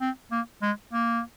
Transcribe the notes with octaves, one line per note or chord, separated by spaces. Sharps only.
C4
A#3
G#3
A#3